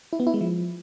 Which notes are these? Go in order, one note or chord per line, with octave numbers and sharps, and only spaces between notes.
E4
B3
E4
G#3
F3